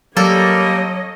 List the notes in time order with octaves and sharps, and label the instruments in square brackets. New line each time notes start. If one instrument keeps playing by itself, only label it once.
[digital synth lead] F#3 [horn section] G3 A#3 [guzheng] A4 [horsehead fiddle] C#5 D#5